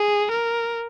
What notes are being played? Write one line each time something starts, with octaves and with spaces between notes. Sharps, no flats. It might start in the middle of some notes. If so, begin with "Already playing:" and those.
Already playing: G#4
A#4